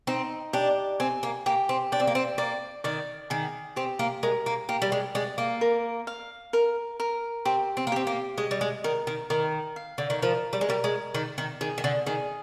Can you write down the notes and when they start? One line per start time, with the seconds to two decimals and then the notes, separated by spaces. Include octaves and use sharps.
0.07 C4 D#4
0.53 D4 G4
1.00 C4 G#5
1.23 A#3
1.46 A#3 G4
1.69 C4
1.92 D4 G5
2.00 C4
2.07 A#3
2.15 C4
2.38 A#3 D5
2.84 D#3 D5
3.30 D#3 G#4
3.76 C4 G4
3.99 A#3
4.23 G#3 A#4
4.46 A#3
4.69 A#3 G4
4.82 G3
4.92 G#3
5.15 G#3 D5
5.38 A#3
5.61 A#4
6.07 F5
6.53 A#4
7.00 A#4
7.45 C4 G4
7.77 C4
7.87 A#3
7.92 C4 G4
8.07 A#3
8.38 G#3 D#5
8.51 G3
8.61 G#3
8.84 D#3 A#4
9.07 D#3
9.30 D#3 A#4
9.76 F5
9.98 D3
10.10 D#3
10.22 F3 A#4
10.53 G3
10.61 G#3
10.69 G3 A#4
10.84 G#3
11.14 D#3 D5
11.38 D#3
11.61 D#3 G#4
11.78 D#3
11.84 D3
12.06 D#3 G#4